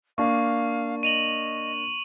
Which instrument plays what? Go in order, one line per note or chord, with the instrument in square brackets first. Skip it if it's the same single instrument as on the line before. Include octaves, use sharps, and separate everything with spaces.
[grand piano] A#3 D4 [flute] F5 [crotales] C#6
[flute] D#5 [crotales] D#7 F7 F#7